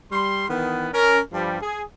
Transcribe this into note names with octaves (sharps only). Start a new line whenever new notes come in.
G3 C6
D#3 E3 B3
C#4 A#4
G2 F3 G3
G#4